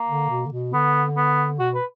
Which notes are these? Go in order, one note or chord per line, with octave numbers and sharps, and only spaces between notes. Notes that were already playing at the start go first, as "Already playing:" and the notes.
Already playing: A#3
D3
B2
D3
B2
D3 B3
B3
B2 F#4
B4